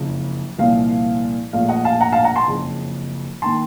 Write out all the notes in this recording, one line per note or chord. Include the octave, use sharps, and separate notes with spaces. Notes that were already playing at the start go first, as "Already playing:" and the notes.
Already playing: F#1 F2 C#3
C2 A#2 F3 F5
A#1 A#2 F3 A3 F5
D#5 F#5
F5 A5
F#5 A#5
F5 A5
F#5 A#5
A5 C6
F#1 F2 C#3
D#3 A#3 A5 C6